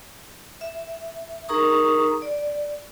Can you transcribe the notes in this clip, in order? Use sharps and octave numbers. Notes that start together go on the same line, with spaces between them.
E5
D#4 G#4 A#4 A#5 C#6 D#6
D5